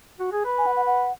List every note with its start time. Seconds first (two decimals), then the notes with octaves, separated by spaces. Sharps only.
0.20 F#4
0.32 G#4
0.45 B4
0.58 G#5
0.66 F#5
0.76 F#5
0.86 F#5